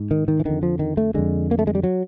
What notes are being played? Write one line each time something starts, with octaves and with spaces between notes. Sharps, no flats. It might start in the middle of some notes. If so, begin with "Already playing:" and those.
Already playing: G#2
D#3
D#3
E3
F2 D3 D#3
F3
D#3
A3
F2 D3 G#3
A#3
A3
G#3
G3
F#3